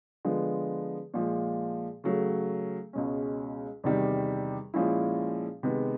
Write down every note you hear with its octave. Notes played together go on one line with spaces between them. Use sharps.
D3 F3 G#3 B3
A#2 F3 G#3
C#3 F#3 A3
C#2 B2 G#3 C#4
E2 C3 D#3 G3
A#2 F3 G#3 C#4 E4
C3 D#3 G#3 B3